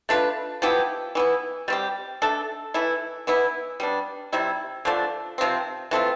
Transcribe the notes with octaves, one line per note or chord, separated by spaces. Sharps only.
A3 D4 F4 B4
F3 B3 E4 G4
E3 B3 E4
G3 C4 G4
A3 D4 A4
E3 A3 E4
E3 B3 E4
G3 B3 D4
C3 G3 C4 E4
D3 F3 A3 D4
C3 F3 C4
E3 A3 C4 F4